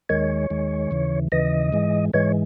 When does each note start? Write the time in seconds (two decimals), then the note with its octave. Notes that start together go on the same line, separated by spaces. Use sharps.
0.09 D#2 D#3 G#3 C#5
0.50 D#2 D#3 G#3
0.91 D#2 C#3 E3
1.32 D#2 C#3 E3 D#5
1.73 G#2 E3 G#3
2.13 G#2 E3 G#3 C#5